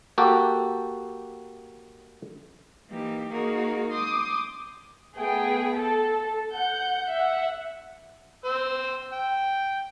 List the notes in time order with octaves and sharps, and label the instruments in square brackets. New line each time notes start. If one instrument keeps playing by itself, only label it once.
[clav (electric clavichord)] A#3 F#4 G4 A4
[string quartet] E3 A#3 D#4 G4
A#3 D#4 F#4 G#4 A#4
C6 D6 D#6 G6
[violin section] A3 B3 G#4 G5
A4
F#5 G6
E5 F#5
[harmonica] C5 E6
G5